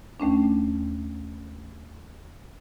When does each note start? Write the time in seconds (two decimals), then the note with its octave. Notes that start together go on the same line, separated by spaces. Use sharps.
0.20 D#2 A3 C#4 D4